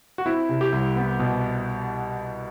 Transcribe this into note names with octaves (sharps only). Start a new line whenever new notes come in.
F#4
C4 E4
C3
G4
C2
B3
B2